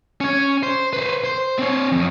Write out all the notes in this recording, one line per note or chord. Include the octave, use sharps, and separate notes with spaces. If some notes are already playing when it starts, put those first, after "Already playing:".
C#4 C#5
C5
B4 C5
C5
C4 C#5
F2